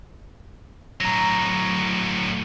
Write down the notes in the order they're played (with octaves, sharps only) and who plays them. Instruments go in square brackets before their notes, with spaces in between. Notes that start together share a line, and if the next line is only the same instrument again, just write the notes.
[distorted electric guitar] A2 F#3 [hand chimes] A#5 A#6